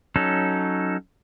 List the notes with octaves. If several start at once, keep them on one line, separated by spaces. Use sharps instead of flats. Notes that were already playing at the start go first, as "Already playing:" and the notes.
F#3 C#4 D#4 A4